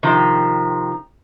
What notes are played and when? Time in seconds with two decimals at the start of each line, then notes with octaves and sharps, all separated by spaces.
0.03 C3 D#3 F3